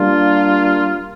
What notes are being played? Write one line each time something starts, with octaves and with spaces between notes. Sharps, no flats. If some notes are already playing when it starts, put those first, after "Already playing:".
Already playing: G3 A#3 D4 F4